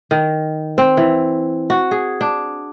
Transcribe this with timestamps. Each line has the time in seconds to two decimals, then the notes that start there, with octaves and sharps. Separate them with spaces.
0.11 D#3
0.78 C4
0.97 E3
1.70 F#4
1.91 G#4
2.21 D4